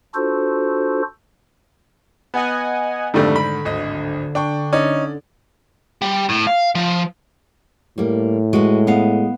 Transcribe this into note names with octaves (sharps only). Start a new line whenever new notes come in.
D4 F4 F#4 A4 C5
B3 D#5 F#5 G#5
F2 G#2 D3 D#3 G3 A3 D4
B5
D1 G#1 D#5
D4 G5 C#6
C#4 D#4 D5
G3
A2
F5
F3
A2 G3 A#3
G#3 F#4 B4
B3 D#5 F5